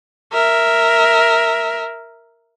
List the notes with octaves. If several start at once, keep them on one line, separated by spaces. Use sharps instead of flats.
A#4 E5